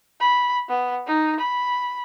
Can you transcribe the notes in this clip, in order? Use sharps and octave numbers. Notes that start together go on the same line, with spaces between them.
B5
B3
D#4
B5